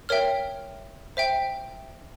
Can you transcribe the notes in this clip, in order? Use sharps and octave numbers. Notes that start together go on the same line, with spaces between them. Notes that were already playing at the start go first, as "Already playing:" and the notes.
A#4 C#5 E5 G5 F6
C5 E5 G5